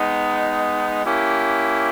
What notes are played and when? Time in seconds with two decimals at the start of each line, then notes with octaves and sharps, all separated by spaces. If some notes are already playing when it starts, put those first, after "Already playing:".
Already playing: G#3 B3 D#4
1.05 A#3 C#4 E4 G4